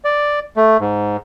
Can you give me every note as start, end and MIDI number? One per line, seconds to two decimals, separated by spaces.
0.05 0.40 74
0.57 0.77 57
0.80 1.17 44